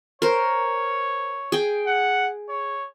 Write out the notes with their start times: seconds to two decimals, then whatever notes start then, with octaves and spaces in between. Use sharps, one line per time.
0.22 A#4 C5 C#5
1.52 G#4 G5
1.87 F#5
2.49 C#5